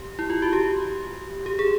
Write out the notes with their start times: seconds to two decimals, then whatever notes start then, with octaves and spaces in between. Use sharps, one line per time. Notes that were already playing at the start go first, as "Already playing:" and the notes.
Already playing: G4
0.19 E4
0.30 F4
0.42 F#4
0.53 G4
1.46 G4
1.59 G#4